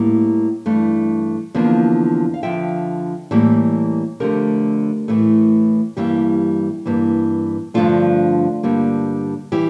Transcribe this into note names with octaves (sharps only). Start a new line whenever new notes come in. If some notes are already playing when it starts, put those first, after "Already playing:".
Already playing: A2 G3 A#3
G2 E3 A3
E2 D3 F3 A#3
F5
F2 D3 F3 E5 G5
A2 E3 G3 A#3
F2 D3 A3 G4 A#4
A2 E3 A3
G2 E3 G3 A#3 E4 G4
G2 E3 A#3
G2 D3 F3 A3 D4 F4
G2 D3 G3 A#3
E3 G3 E4 G4